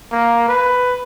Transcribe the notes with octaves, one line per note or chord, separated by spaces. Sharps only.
A#3
B4